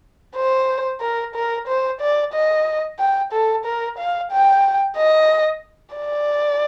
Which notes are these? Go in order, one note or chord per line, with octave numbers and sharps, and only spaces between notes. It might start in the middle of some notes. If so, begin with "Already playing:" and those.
C5
A#4
A#4
C5
D5
D#5
G5
A4
A#4
F5
G5
D#5
D5